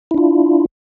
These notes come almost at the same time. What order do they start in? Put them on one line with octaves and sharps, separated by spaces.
E4 D4 F4